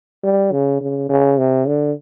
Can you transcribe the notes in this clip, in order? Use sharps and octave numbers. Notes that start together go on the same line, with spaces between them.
G3
C#3
C#3
C#3
C3
D3